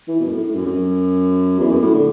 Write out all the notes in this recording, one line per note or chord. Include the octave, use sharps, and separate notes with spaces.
E3
B2
F#2
A2
A2
F#2
F#2
E2
F#2
A2
D3